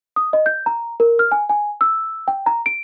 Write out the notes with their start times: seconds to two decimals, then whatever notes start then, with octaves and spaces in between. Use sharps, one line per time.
0.16 D#6
0.33 D#5
0.46 G6
0.66 A#5
1.00 A#4
1.19 F6
1.32 G#5
1.49 G#5
1.81 E6
2.28 G5
2.46 A#5
2.66 D7